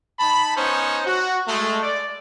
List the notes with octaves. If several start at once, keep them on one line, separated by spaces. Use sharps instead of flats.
D#4 A5 B5
B3 C#4 D#4 C5
F#4
G#3 A3
D5